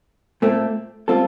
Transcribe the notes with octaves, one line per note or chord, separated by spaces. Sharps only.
A#2 A3 C4
G3 C4 F4 A4